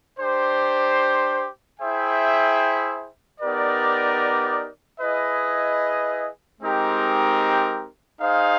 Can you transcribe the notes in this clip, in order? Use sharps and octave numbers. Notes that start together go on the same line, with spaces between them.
D4 G4 C5
E4 G#4 C5 E5 G5
B3 D#4 G4 A#4 D5
E4 G#4 B4 D#5
G#3 C4 D#4 G4 A#4
D#4 G#4 C5 F5